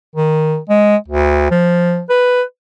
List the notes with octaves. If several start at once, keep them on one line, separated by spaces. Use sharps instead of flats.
D#3
G#3
D2
F3
B4